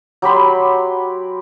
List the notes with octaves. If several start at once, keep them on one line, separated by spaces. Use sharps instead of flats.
F#3 G4 B5 C6